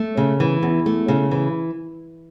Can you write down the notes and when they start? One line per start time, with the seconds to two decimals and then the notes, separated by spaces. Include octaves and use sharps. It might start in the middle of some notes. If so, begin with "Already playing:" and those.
Already playing: A3
0.17 C#3
0.40 E3
0.63 E2
0.86 A3
1.08 C#3
1.31 E3